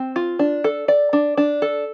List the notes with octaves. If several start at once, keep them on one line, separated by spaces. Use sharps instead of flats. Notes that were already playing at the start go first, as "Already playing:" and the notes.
Already playing: C4
F4
D4
A4
D5
D4
D4
A4